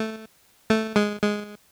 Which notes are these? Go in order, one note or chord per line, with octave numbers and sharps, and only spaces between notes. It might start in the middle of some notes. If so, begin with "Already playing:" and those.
Already playing: A3
A3
G#3
G#3